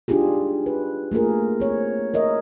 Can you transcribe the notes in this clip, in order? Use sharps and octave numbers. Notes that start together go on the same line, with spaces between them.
D4 D#4 F4 G4 G#4
B4
A3 A#3 F4 G#4 A#4
C4 C#5
A#4 C#5 D#5 E5